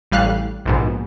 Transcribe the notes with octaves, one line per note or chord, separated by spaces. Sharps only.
A1 G3 F5 F#6
A#1 G#2 B2